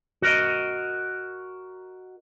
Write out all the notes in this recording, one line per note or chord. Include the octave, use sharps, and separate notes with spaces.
F#4 A#4 D#5